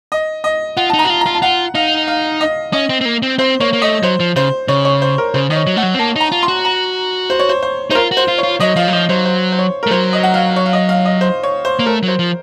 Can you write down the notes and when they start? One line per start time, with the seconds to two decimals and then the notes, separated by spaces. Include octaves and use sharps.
0.12 D#5
0.44 D#5
0.77 F4 F#5
0.90 D#4 A5
0.99 A#5
1.04 F#4
1.10 F4
1.21 A#5
1.26 F4
1.35 A5
1.42 F4 F#5
1.75 D#4 F5
2.08 F5
2.41 D#5
2.73 C#4 D#5
2.90 C4
3.01 C4
3.05 A#3
3.22 C4
3.38 C4 C5
3.60 A#3 C#5
3.73 A#3
3.82 A3 D#5
4.03 F#3 C5
4.20 F3
4.36 C#3 C5
4.68 C#3 C#5
4.85 C#5
5.02 C5
5.18 A#4
5.34 C#3 C5
5.50 D#3 D#5
5.56 C#5
5.67 F#3
5.76 A3 F#5
5.83 F#3
5.94 C4
5.99 A#3 A5
6.16 D#4 A#5
6.32 F4
6.43 C6
6.48 F#4
6.65 A#5
7.30 C5
7.39 C#5
7.49 C5
7.62 C5
7.90 D#4 C5
7.95 F4 A#4
8.11 F#4
8.17 C5
8.28 F4
8.38 C#5
8.43 F4
8.60 F#3 D#5
8.76 F3 F5
8.88 F#3
8.93 F3 D#5
9.09 F#3 C5
9.25 C5
9.52 C5
9.59 C#5
9.83 A#4
9.87 A3
9.90 F#3 C5
10.13 D#5
10.23 F#5
10.34 F5
10.56 C#5
10.66 F5
10.73 D#5
10.89 F5
11.05 D#5
11.21 C5
11.43 C#5
11.65 C5
11.79 A#3
11.86 A3 A#4
12.03 F#3
12.08 C5
12.19 F3